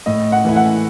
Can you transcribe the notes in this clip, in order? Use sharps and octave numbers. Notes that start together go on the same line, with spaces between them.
A2 D#5
F#5
E3 A3 E4
F#5